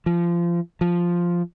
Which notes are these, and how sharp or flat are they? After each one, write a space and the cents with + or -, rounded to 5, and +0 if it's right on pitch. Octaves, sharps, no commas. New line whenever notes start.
F3 -25
F3 +0